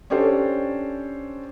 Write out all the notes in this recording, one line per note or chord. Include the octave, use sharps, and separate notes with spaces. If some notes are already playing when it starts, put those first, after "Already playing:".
C#4 D4 G4 A4 C5